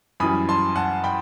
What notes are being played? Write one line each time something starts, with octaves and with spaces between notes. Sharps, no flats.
F#2 E3 G3 B5 D#6
A5 C6
F#5 A5
G5 B5